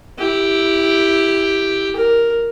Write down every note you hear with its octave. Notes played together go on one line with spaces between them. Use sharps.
E4 G4
A#4